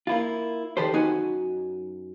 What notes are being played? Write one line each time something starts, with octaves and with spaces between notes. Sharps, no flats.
A#3 E4 F4
D#3 G4 A4 B4 C5
F#2 D#4 F#4 G#5